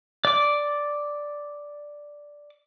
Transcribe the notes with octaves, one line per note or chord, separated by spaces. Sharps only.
D5 D6